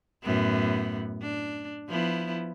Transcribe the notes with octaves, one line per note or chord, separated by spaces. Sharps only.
F#2 A2 B3
D4
F3 B3 E4